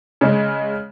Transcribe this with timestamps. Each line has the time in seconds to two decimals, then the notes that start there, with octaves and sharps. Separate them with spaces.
0.21 C#3 G#3